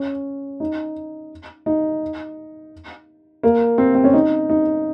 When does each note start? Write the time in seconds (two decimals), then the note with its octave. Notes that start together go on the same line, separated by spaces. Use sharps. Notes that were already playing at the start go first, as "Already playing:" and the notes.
Already playing: C#4
0.60 D#4
1.66 D#4
3.43 A#3
3.78 C4
3.95 C4
4.04 C#4
4.14 D#4
4.49 D#4